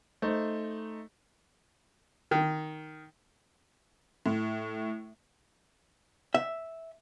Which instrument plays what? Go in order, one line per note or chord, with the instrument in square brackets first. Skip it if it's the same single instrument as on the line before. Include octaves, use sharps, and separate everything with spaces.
[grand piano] A3 D#4 C5
[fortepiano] D#3
[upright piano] A2
[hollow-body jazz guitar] E5